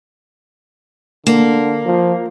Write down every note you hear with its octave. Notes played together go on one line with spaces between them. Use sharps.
D3 A#3
F3